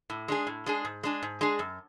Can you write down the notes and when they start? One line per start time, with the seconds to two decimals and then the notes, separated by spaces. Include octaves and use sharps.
0.10 A2
0.28 G#3 D4 G#4
0.47 A2
0.66 G#3 D4 G#4
0.85 G#2
1.03 G#3 D4 G#4
1.23 G#2
1.41 G#3 D4 G#4
1.59 F#2